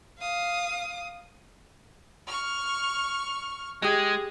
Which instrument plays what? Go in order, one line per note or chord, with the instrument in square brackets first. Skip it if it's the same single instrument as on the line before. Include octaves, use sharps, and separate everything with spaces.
[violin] F5 D#6
[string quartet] C#6 F6
[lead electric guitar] G#3 [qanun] G4 D#5 [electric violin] G#4